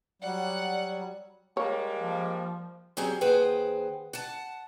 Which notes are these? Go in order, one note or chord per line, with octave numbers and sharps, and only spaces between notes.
F#3 G3 D5 F#5
G3 G#3 A#3 C#5
F3
F#3 G3 C4 C#4 G#4
D#2 G#4 B4 C5 F#5 G5
F#5 A5